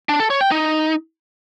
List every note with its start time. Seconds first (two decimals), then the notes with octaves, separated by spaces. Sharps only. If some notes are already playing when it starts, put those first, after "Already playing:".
0.09 D4
0.20 A4
0.30 C#5
0.41 G5
0.51 D#4